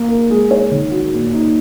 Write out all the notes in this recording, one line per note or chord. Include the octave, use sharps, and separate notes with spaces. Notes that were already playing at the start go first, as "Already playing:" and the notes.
Already playing: A#3
A#4
G#3
C#5
D#3
F#4
A#2
D#4